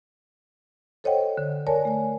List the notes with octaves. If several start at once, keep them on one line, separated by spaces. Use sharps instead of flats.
A4 C5 C#5 D#5 F#5 G5
D3
A#4 C#5 D5 G#5 A5
A3 G#5